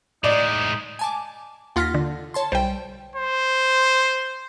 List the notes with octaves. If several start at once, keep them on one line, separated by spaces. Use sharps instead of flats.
A2 G#3 D#4 D5
G#5 A5 D6
D#2 F4 F#5 F6 A#6 B6
D3
C#5 A5 C6
B1 G3 C5 G5
C5